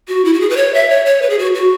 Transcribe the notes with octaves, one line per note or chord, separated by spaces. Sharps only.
F#4
E4
F#4
G#4
B4
C#5
E5
C#5
C#5
B4
G#4
F#4
F#4